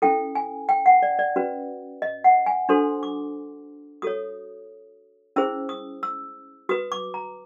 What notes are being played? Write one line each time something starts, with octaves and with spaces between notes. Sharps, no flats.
C#4 E4 A4 G5
G#5
G5
F#5
D5
D5
C#4 F#4 B4
D#5
F#5
G#5
D4 F#4 A4 C5 C6
D6
F#4 A4 C#5 D#6
C#4 E4 G#4 C5 E6
D#6
E6
F#4 B4 D#6
D6
A#5